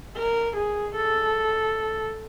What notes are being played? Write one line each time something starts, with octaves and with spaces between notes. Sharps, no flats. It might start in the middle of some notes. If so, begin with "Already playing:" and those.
A#4
G#4
A4